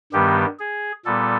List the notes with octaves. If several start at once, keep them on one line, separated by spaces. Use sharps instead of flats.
G2 D#3 G3 B3 G4
G#4
A#2 G3 B3 A4